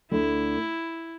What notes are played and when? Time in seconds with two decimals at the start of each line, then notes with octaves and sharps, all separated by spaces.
0.11 D2 D3 A3 E4